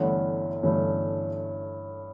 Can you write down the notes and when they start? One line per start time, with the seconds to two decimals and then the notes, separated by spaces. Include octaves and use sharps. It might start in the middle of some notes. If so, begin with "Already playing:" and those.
Already playing: G1 G2 E3 A3 C#4 F#5
0.63 G1 G2 E3 A3 C#4